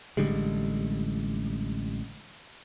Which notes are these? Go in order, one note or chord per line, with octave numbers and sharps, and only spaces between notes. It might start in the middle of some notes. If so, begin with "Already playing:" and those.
A1 D3 G3 G#3